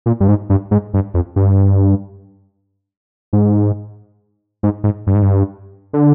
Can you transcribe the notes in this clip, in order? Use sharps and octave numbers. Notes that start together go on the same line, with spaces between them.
A#2
G2
G#2
G2
G#2
G2
F2
G2
G#2
G#2
G#2
G2
G#2
G2
D3